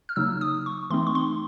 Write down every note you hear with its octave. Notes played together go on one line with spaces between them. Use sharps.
F6
C#3 F#3 A#3 D#4 E6
D#6
C#6
E3 A3 C4 D#4 C6
C#6
C6